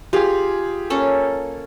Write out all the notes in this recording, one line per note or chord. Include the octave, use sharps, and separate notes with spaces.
F4 G4 G#4 F5
A#3 C#4 A4